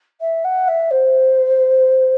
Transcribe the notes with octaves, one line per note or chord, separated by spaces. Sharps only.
E5
F#5
E5
C5